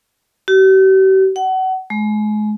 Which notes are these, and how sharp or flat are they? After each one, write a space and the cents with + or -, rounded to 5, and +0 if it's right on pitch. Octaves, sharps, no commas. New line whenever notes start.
G4 -45
F#5 +30
G#3 +35